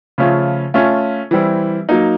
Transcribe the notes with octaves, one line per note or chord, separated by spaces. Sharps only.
C#3 F3 A3 C#4 F4
A3 C#4 F4
E3 G3 C4 E4
F#3 A#3 D#4